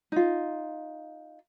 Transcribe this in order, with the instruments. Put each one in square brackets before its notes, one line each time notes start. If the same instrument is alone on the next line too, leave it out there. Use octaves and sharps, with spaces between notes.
[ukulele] D#4 F4